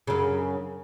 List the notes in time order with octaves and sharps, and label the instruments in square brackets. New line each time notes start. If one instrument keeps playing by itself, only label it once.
[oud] F#2 C#3